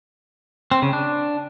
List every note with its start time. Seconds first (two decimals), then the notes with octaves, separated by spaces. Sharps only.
0.71 C4
0.82 C#3
0.93 D4